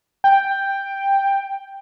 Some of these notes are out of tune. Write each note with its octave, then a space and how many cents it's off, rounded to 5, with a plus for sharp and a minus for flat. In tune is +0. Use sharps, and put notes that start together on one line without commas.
G5 +5